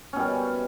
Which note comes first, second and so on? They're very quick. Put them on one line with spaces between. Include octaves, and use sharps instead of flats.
C#4 B2 G3